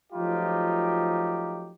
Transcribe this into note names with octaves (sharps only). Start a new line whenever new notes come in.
F3 F#3 A3 D#4 F4 G4